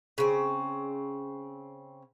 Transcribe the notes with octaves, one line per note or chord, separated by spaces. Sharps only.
C#3 C4